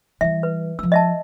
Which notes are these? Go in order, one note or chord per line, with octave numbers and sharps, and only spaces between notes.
E3 G3 E5
B4
F3 F4 E6
D#5 E5 A5